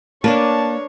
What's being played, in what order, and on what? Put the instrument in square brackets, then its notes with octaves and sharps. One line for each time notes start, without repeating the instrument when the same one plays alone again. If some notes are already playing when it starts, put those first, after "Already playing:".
[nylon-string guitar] A#3 [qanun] D4 A#4 B4 [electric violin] C#5 [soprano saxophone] A5